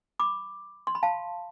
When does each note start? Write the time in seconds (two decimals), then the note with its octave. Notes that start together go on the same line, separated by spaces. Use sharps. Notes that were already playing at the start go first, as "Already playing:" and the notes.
0.20 B5 D6
0.87 C6
0.95 B5
1.03 F5 A5